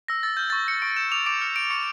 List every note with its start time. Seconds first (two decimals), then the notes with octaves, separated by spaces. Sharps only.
0.08 E6 A#6
0.23 E6 A6
0.37 F6 G6
0.50 C#6 A6
0.67 G6 C#7
0.82 C#6 D7
0.97 G6 E7
1.12 D6 F7
1.26 D6 D7
1.41 F6 C#7
1.56 E6 D7
1.70 C#6 C#7